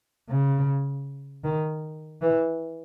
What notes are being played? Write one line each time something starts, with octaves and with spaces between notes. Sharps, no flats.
C#3
D#3
E3